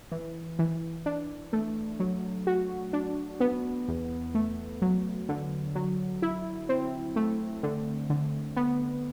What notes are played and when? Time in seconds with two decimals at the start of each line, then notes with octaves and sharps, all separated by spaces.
0.12 E3
0.59 E3
1.06 D4
1.53 A3
2.00 F#3
2.47 F#4
2.93 D4
3.40 B3
3.88 E2
4.35 A3
4.82 F#3
5.29 D3
5.75 F#3
6.22 E4
6.69 C4
7.16 A3
7.63 D3
8.10 D3
8.56 B3